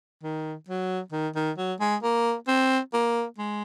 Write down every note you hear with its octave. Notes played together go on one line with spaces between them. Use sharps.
D#3
F#3
D#3
D#3
F#3
G#3
A#3
C4
A#3
G#3